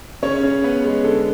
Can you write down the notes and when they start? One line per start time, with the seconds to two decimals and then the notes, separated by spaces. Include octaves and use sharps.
0.22 C#3 C#4 C#5
0.43 C#3
0.64 B3
0.84 G#3
1.04 D3 A4